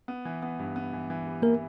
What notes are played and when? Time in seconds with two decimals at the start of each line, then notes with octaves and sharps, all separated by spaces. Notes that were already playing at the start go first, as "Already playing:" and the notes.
0.08 B3
0.25 E3
0.42 B3
0.59 G2
0.76 B3
0.93 E3
1.10 E3
1.26 G3
1.42 E3 A#3 A#4